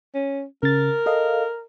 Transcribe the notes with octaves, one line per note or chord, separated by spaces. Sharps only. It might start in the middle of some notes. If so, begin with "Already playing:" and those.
C#4
C#3 A#4 A6
A4 D#5 F5